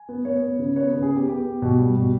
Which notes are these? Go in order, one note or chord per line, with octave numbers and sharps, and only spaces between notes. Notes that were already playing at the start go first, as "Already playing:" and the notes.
Already playing: G#5
B3
B3 C#5
B3
C#3
B3 C#5
C#3 B4
G#4
B3 G4
B3 G4
B3
B2
G3
B2